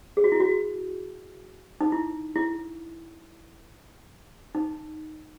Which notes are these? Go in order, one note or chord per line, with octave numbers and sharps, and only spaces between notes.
G#4
F#4
E4
F#4
D#4
E4
E4
D#4